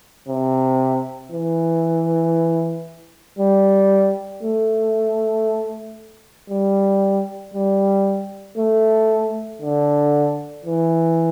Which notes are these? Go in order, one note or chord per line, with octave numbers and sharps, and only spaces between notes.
C3
E3
G3
A3
G3
G3
A3
D3
E3